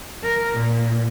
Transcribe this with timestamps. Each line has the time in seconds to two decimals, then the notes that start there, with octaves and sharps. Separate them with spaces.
0.23 A#4
0.56 A#2